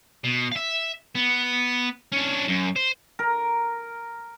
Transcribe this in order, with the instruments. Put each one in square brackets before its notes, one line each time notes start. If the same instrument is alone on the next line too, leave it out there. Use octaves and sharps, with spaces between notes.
[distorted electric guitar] B2
E5 F5
B3
C#4 D4
F#2
C5
[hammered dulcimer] A#4